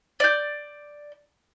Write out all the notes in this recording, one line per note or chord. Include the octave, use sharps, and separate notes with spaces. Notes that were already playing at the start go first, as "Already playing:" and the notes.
D5 G6